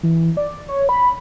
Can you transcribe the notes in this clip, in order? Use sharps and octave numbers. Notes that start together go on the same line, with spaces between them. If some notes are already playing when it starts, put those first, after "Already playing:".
E3
D5
C#5
B5